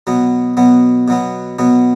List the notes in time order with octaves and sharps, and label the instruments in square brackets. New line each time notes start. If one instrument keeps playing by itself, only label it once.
[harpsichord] B2 F#3 B3
B2 F#3 B3
B2 F#3 B3
B2 F#3 B3